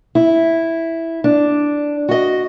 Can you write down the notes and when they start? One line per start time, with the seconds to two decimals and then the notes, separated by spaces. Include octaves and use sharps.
0.15 E4
1.24 D4
2.09 F#4 D#5